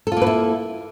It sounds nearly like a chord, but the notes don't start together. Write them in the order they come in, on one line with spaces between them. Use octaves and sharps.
A4 F4 A#3 B4 E4